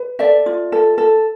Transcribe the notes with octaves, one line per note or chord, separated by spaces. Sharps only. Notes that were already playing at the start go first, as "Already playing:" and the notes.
Already playing: B4
A4 D5 E5
F4
A4
A4